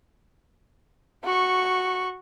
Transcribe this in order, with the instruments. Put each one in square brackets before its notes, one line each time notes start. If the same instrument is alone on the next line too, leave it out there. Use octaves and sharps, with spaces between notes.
[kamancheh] F#4 C#6